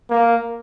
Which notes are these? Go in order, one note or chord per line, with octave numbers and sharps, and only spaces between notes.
A#3